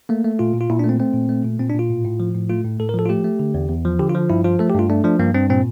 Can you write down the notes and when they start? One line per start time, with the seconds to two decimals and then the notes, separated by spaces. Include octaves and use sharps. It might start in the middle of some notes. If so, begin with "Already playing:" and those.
0.09 A3 A#3
0.25 A3
0.39 A#2 F4
0.54 A#2
0.61 F4
0.70 A#2 E4
0.79 D4
0.84 A3
0.89 C4
0.99 A3 C4
1.14 A#2
1.29 A3
1.45 A#2
1.60 A#2 C4
1.70 D4
1.74 A#2
1.79 F4
1.90 A2
2.05 A2
2.20 F3
2.35 A2
2.49 A3 F4
2.65 A2
2.80 A2 A4
2.89 A#4
2.94 F3
2.99 A4
3.06 F4
3.09 A3 G4
3.24 A3
3.39 D3
3.54 E2
3.69 E2
3.85 F3
3.99 D3 G4
4.10 F4
4.14 F3
4.30 G2 E4
4.44 F3 F4
4.59 A3 A4
4.69 G4
4.74 G2 F4
4.90 A3 D4
5.04 F3 D4
5.20 G2 A#3
5.34 G2 C4
5.49 A#2 C4